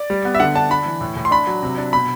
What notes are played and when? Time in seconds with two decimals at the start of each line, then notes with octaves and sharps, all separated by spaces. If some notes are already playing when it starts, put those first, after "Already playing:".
Already playing: D5
0.10 G3
0.25 B3
0.35 E5
0.40 D3 F#5
0.55 D4 A5
0.70 D4 B5
0.86 E3
1.01 A2
1.16 A2
1.25 C6
1.31 D4 B5
1.47 F#3
1.63 C3
1.78 D4
1.93 B2 B5